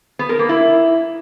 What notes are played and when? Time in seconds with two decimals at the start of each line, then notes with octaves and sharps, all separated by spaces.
0.19 B3
0.29 A#4
0.39 A#3
0.49 E4